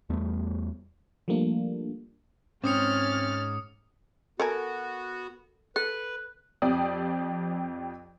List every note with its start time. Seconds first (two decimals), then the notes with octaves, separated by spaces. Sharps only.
0.10 E2 G3 A3 B3
1.28 F3 G3 A3 A#3 D4
2.64 G#2 C4 C#4 D6 D#6 F6 A6 C#7
4.40 B3 F#4 A4 A#4 G#5
5.76 A4 B4 F#6
6.62 F2 F3 C4 G4 D5 D#6